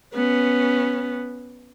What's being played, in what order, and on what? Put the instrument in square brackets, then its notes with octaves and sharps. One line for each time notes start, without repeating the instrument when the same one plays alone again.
[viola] B3 C#4